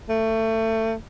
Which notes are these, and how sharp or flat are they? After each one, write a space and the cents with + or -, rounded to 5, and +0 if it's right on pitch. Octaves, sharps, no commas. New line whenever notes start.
A3 +25